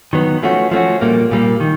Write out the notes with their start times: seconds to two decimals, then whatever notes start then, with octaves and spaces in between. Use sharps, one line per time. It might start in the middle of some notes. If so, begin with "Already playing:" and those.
0.13 D#3 F#3 B3
0.43 F3 A3 C#4 F#4
0.71 F3 A3 C#4 F#4
1.01 A#2 G3 A#3
1.31 A#2 G3 A#3
1.60 D#3